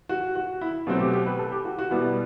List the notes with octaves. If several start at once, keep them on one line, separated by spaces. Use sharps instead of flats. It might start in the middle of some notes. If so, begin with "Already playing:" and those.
F#4
F#4
E4
B2 F#3 A3 C4 F#4
G4
G4
B4
A4
G4
F#4
F#4
B2 G3 B3 E4